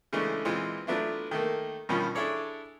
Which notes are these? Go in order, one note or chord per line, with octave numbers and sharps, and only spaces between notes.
C#3 E3 G#3 A3 C#4 D4
A#2 E3 G#3 C4 F4
F#3 A3 B3 D4 E4 F4
D#3 A3 A#3
G2 B2 D#3 F3 C#4 F4
D4 E4 G#4 A4 C#5 D5